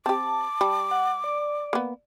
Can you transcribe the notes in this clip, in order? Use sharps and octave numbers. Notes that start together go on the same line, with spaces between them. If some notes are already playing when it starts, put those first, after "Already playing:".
C4 G4 A5 D6
G3
F#5
D5
A#3 B3